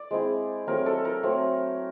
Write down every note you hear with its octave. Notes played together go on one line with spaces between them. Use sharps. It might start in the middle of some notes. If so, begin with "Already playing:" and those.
Already playing: D5
G#3 C4 E4
F#3 A3 C4 A#4
A4
A#4
F#3 A3 C4